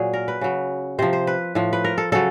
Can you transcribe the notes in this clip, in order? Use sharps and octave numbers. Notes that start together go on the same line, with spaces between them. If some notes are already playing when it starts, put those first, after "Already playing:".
Already playing: A#2 F#3 G#4
A#4
B4
C#3 F#3
C3 F3 C5
C5
B4
A2 F3
B4
A#4
A4
C#3 F#3 A4